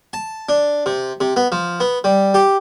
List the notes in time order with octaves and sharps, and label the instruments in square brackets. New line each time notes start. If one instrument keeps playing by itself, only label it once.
[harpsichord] A5
D4
C3
C3
B3
F3
B3
G3
G4